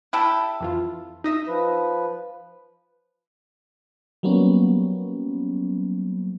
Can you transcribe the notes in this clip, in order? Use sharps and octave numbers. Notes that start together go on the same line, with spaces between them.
E4 G4 A4
F2 E3 F4
D#4 D#5 E5
F3 B4
F#3 G3 A#3 B3 C#4